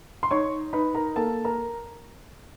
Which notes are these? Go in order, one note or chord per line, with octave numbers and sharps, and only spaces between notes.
C6
D#4 C#5 C#6
D#4 B4 B5
A#4 A#5
A#3 A4 A5
A#4 A#5